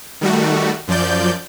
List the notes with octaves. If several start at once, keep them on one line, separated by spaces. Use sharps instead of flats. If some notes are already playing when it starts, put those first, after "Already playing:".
D#3 G3 A3 F#4
F#2 F3 D5 G6